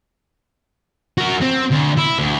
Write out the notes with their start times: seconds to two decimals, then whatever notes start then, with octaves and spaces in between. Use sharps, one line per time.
1.18 F#4 A#4
1.41 C4
1.71 D2
1.97 E4
2.19 D2